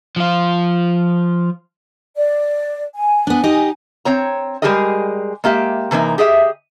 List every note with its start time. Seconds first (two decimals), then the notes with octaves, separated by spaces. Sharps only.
0.16 F3 F4
2.15 D5
2.95 G#5
3.27 B3 D4
3.44 D#4 G4 D#5
4.05 C4 C#5 A#5
4.62 G3 G#3 G4 G#4 A#4 D#5
5.44 G#3 A#3 G4 E5
5.91 C3 E3 A#3 D#4
6.18 G4 G#4 D#5 E5